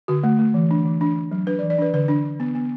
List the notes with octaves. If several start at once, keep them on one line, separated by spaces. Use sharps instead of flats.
D3 F#4
A3
A3
E3
D4
E3
D4
D4
F#3
D4 B4
D5
E3
D5
D4 B4
D3 B4
D4
D4
B3
B3